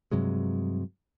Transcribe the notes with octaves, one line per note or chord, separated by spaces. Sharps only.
G2 C3 F#3 G#3